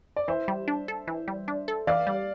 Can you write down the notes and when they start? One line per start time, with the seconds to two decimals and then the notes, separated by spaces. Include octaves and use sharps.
0.16 D5
0.28 E3 C5 E5
0.48 G3
0.68 D4
0.88 A4
1.08 E3
1.28 G3
1.48 D4
1.68 A4
1.87 E3 D5 F5
2.07 G3